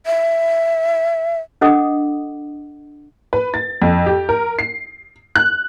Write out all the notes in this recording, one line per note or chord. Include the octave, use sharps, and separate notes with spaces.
E5
D4 A4 D#5 F#5 D6 D#6
B4
A6
F2
G4
A#4
C7
F#6